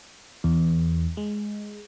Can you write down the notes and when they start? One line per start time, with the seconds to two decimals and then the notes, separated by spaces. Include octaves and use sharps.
0.44 E2
1.17 G#3